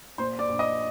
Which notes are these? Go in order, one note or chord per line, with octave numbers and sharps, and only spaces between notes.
A#2 C5 C6
D5 D6
A#1
D#5 D#6